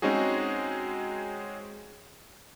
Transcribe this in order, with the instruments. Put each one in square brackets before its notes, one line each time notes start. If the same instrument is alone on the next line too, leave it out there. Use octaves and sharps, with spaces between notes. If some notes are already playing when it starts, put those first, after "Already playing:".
[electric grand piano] G#3 C4 C#4 D#4 F#4 G#4